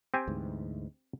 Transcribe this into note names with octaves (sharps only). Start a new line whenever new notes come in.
C4 G4 G#5
D2 G#2 E3